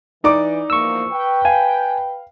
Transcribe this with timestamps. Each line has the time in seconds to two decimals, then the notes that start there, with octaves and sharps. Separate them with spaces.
0.24 E3 D#4 D5 D6
0.70 E2 F3 A#3 C#6 E6
1.11 B4 G5
1.45 F5 G#5